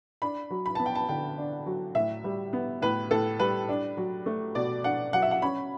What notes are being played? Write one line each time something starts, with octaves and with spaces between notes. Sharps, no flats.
D4 B5
F#3
B5
B3 A5
G5
A5
D3 G5
D4
F#3
A2 E5
G3
B3
A2 B4
A2 A4
G3 B4
D4
F#3
A3
B2 D5
D4 F#5
F#3 F#5
E5
F#5
C#4 B5